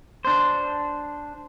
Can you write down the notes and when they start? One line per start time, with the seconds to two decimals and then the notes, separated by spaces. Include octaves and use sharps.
0.25 D4 C5